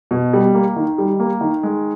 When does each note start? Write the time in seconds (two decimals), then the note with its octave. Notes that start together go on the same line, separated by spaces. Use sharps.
0.11 B2
0.33 G3
0.54 A#3
0.76 D#3
0.98 G3
1.20 A#3
1.41 D#3
1.63 G#3